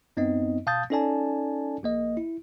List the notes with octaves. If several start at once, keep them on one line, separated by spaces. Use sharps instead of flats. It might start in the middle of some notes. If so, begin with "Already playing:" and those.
F#2 B3 C4 D#4 D#5
B2 F5 A5 D#6 G6 A6
C#4 D#4 A4 D5 G#5 A5
A#1 A#3 D#5
E4